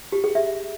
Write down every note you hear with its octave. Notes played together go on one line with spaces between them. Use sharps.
G4
G#4
E5